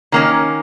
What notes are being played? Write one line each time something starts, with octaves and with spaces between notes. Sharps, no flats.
D#3 A#3 C#4